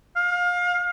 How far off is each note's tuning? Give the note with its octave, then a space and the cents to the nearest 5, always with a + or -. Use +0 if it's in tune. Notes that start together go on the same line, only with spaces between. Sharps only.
F5 +30